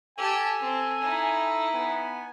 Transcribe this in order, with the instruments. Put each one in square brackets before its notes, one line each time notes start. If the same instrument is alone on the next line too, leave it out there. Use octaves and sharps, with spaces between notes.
[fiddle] G4 A5 [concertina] A4 [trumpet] G#5
[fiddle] C4
D#4 E4
[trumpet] B3 [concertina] G#5